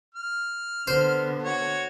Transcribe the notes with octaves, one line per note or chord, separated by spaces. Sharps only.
F6
D3 B3 C5
F#4 C#5